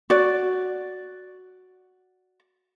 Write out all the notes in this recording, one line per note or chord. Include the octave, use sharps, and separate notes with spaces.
F#4 D5